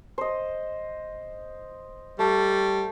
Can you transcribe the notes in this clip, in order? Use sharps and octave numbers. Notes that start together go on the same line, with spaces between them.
C5 D#5
G3 A3